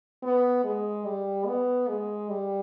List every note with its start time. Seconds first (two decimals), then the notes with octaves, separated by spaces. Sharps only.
0.23 B3
0.64 G#3
1.06 G3
1.47 B3
1.88 G#3
2.29 G3